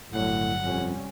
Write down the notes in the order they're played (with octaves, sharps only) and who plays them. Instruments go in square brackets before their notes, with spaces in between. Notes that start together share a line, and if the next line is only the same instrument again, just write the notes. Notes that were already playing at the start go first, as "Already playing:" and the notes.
[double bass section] G1 D3 F#3 [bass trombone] A2 [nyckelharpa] F#5
[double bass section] C2 G3 C#4 [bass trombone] F2